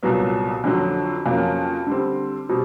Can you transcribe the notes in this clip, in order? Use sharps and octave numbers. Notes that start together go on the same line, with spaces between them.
C2 A#2 F#3 B3
F2 D3 F#3
F2 C#3 F#3 A#3
D3 G3 C4
B2 G3 C4